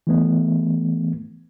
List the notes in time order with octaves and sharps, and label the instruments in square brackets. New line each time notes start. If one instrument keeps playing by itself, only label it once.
[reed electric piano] E3 A3 B3